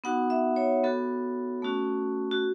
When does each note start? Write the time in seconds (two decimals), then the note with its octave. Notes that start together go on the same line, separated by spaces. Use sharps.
0.04 B3 D#4 F#4 F#5
0.30 E5
0.56 C#5
0.83 B3 F#4 A4
1.62 A3 C#4 F#4
2.31 F#4